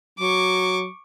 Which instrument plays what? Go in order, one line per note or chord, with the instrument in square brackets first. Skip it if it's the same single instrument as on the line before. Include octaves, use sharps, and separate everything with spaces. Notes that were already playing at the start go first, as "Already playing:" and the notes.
[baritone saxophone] F#3 [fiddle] C#6 D6